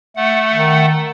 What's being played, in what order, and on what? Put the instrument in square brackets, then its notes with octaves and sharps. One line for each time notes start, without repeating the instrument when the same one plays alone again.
[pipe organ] A3 F#5
[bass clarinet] D#3